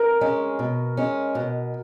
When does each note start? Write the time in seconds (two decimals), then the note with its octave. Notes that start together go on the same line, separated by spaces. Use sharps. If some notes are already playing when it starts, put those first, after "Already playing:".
Already playing: A#4
0.21 G#3 C#4
0.59 B2
0.97 G#3 C#4
1.35 B2